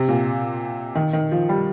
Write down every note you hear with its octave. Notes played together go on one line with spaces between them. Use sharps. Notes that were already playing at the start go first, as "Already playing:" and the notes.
Already playing: C3
A#2
D#3
D#3
F3
G3